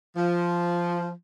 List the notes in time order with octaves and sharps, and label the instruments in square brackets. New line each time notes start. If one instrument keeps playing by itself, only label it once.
[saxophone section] F3